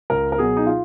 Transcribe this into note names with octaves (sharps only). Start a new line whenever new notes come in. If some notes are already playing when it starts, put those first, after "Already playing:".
C#2 A#4
A#4
B2 F#3 G#4
D#4
F4